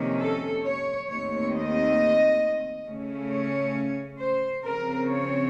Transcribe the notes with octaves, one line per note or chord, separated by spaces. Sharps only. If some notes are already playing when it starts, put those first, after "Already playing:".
Already playing: F2 C3 D#3 A#3 C#4
A4
C#5
D#2 D#3 A3 C4 C#5
D#5
C#3 A3 C#4
C#5
C5
C#3 F3 C4 A#4
C#5